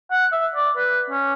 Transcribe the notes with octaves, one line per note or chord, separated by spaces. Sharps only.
F#5
E5
D5
B4
C#4